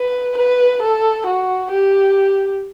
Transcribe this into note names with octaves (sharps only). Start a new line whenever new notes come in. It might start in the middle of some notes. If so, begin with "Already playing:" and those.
Already playing: B4
B4
A4
F#4
G4